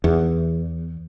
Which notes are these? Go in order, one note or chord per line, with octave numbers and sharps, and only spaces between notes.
E2